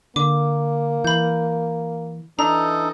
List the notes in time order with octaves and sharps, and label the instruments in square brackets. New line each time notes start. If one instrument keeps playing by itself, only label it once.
[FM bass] D3 [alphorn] A#3 [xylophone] D6
[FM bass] E3 [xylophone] B5 G6
[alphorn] E3 [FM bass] D4 [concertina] D#4 A4 [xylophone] A#5